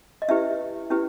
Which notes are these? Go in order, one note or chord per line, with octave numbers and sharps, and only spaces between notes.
D#5
C#4 E4 G4 B4 E5
C#4 E4 G4 B4